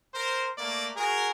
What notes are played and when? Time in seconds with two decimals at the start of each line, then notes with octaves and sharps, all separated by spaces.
0.14 A#4 C5
0.58 A3 A#3 D5
0.96 F#4 G#4 A#4